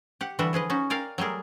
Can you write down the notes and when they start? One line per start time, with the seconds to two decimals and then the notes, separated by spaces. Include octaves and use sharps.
0.21 G4 F#5
0.39 D3 E3 G3 F#4 E5 F#5
0.53 F3 G#4 B4 D#5
0.70 C#4 D#4 F#4
0.90 A#4 C#5 D5 F5 G5 G#5
1.18 F#3 G3 A3 G#4 A#4